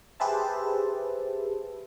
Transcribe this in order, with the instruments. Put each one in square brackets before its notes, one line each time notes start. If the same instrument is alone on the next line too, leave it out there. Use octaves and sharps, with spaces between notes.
[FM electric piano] G4 G#4 B4 C5 E5 A5